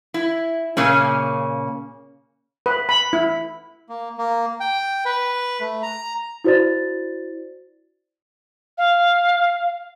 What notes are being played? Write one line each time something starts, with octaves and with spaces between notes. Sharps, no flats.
E4
A#2 C#3 A#3 C#4
B4
B5
E4
A#3
A#3
G5
B4
A3
A#5
E4 F#4 C5 D5 A6
F5